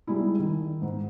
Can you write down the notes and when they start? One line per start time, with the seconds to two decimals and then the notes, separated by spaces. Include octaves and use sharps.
0.07 G3 G#3 D#4 E4
0.39 D#3
0.82 G#2